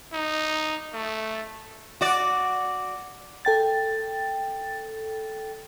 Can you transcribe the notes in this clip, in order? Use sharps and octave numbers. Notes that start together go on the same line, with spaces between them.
D#4
A3
F#4 D5
A4 G5 A6